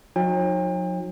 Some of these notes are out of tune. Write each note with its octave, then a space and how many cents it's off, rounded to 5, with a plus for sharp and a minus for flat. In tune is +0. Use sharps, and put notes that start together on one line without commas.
F#3 -40 D#4 +0 G5 +40